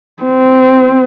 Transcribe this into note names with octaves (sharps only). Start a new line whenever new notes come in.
C4